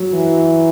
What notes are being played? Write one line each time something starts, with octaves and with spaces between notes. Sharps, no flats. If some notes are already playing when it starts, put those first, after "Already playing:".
Already playing: F#3
E3